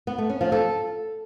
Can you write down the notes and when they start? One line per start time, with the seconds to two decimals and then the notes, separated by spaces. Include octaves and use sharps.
0.07 B3
0.18 A3
0.30 C#4
0.41 F3
0.52 A4